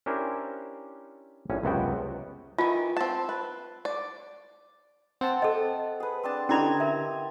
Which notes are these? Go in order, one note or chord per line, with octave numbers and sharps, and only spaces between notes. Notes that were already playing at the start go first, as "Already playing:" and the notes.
C#4 D4 E4 G4 A#4 C5
A#1 A2 C#4
C#2 F#2 C3 B3 F#4 G5
D#3 E3 F4
C4 A5
B4
D5
C4 F#5 A5
A4 D#5
G#4 B4
C4 D4 A5
D3 C4 C#4 E4 G4 D#5 B5 G#6
A#4 E5